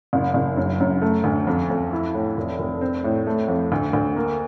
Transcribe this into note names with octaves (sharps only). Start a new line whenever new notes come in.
F#1
F#1
F#2
F#2
A3
D2
F2
F2
E4
A2
F1
F1
C4
A2
A3
F2
D2
D2
A#3